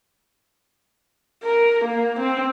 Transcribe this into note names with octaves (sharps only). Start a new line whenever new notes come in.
A#4
A#3
C4